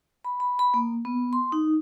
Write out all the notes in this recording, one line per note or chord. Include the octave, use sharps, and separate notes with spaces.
B5
B5
B5
A#3
B3
C6
D#4